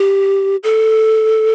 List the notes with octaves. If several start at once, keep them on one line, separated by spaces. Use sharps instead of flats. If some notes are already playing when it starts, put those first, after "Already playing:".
Already playing: G4
A4